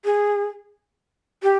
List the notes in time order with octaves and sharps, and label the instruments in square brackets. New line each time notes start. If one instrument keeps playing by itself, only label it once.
[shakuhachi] G#4
G4